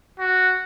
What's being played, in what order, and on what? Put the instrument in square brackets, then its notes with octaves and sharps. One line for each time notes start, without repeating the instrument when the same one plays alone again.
[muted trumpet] F#4